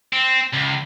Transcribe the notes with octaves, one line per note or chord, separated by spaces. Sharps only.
C4
C#2